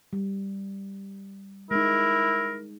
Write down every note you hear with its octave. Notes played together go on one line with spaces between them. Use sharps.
G3
G#3 D#4 E4 A#4